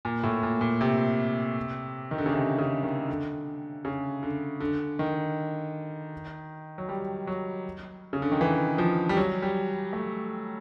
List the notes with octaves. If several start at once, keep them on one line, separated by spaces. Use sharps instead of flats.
A#2
A2
A#2
A#2
C3
D#3
D3
C#3
C3
C#3
D#3
D3
C#3
D3
D3
D#3
F#3
G3
F#3
C#3
D3
D#3
E3
F3
G3
F#3
G3
A3